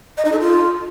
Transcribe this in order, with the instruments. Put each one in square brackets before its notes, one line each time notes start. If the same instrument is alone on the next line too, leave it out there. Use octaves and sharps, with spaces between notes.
[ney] D#5
D#4
A4
F4